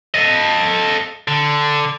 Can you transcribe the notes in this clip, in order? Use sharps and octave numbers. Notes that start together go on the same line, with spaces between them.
A4 D#5
D3